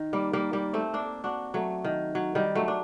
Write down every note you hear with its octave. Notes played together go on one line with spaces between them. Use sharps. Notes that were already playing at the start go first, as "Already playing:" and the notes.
Already playing: D#3
G3 A#3
G3 A#3
G3 A#3
A3 C4
A#3 D4
D4 F#4
F#3 A3
D#3
F#3
D#3 G3
F#3 A3
D4